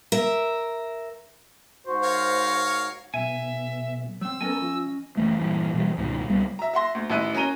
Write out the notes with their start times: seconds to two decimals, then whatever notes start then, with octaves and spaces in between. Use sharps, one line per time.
0.12 A#4 E5
1.87 G#2 F#4 C5
2.03 A#4 C#5 F5
3.14 B1 B2 E5 G#5
4.21 F#3 C4 E6
4.41 B3 C#4 A4 A#4 D#5 G#5
4.61 F3
5.17 F#1 E3 A3
5.39 A#1 G2 E3
5.73 B2 E3 G3
5.97 C#2 G#2 B2 D#3
6.29 C#2 G3 B3
6.59 E5 A#5
6.74 E5 F#5 C6 A#6
6.95 D2
7.10 A1 D#3 E4 E5 F#6 D#7
7.35 C#4 F#4 A#4 A#5 D#7 G7